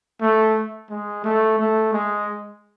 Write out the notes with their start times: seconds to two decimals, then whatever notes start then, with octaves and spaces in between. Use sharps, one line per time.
0.21 A3
0.90 G#3
1.24 A3
1.59 A3
1.93 G#3